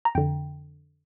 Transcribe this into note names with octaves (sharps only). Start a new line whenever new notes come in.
A#5
F2 D3 G5